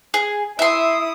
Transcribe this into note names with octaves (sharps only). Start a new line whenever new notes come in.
G#4
E4 E5 C6 D#6